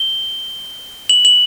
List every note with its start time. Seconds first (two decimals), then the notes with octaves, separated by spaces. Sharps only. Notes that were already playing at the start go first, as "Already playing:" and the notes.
Already playing: G7
1.09 F#7
1.25 F#7